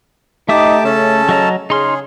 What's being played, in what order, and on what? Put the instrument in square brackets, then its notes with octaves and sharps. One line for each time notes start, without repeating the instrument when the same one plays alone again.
[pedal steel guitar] A3 E5 D#6 [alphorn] D#4 [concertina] G4 A5 D6
[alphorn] C#3 [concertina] C#4 A4 A5
[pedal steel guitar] F#3 D#5 A#5
[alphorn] C#3 [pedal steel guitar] D#4 C6 F6 [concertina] G#4